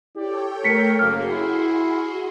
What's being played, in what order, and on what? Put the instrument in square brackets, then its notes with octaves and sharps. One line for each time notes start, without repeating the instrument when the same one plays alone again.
[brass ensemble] E4 G4 D5 [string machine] A4 C#5 G5
[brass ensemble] A3 A#4 [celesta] B6 C#7
[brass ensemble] F#1 A#3 [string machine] F#4 G#4 C6 [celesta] F6
[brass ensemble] E4